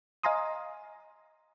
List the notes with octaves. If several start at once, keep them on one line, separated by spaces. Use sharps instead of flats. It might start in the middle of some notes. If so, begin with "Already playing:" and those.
D#5 F5 G#5 A#5 C6 D#6